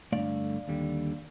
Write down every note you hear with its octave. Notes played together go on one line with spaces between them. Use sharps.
G2 D3 A3 D5 F5
D#2 D3 G3